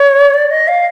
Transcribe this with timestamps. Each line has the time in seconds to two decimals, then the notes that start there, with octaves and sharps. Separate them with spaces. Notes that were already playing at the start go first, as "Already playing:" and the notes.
Already playing: C#5
0.34 D5
0.51 D#5
0.68 F5